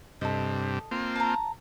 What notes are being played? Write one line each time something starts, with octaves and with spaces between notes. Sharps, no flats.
G2 C3 A4 D#5
A#3 C4 F4
A5 A#5